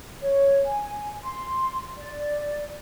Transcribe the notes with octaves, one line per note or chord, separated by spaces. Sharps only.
C#5
G#5
C6
D5